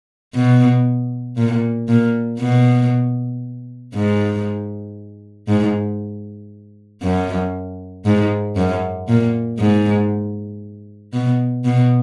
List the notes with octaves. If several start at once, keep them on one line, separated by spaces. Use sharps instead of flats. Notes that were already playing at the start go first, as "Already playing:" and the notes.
B2
A#2
A#2
B2
G#2
G#2
F#2
G#2
F#2
A#2
G#2
B2
B2